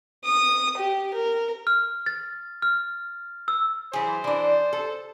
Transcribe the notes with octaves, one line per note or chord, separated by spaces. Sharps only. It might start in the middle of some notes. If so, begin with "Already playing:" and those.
D#6
G4
A#4
F6
A6
F6
E6
E3 F#3 G#4 C5
E3 D4 D5
A4